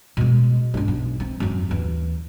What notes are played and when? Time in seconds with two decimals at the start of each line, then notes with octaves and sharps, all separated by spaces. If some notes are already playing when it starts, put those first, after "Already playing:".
0.17 B2 G#3
0.74 G1 D4
0.88 B1
1.20 C4
1.40 F#2 C4
1.69 D#2 E3